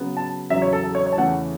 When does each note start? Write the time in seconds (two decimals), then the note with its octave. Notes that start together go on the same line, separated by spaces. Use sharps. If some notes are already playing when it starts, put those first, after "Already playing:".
Already playing: C#3 F#3 B3
0.17 A5
0.50 E2 C#3 F#3 E5
0.62 C#5
0.73 A4
0.84 A4
0.95 C#5
1.06 C#5
1.13 A5
1.17 E2 C#3 E3 A3 C#4 F#5